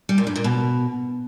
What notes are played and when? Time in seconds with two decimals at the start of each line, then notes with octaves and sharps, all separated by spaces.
0.09 G3
0.18 A#2
0.27 G2
0.36 A#2
0.44 B2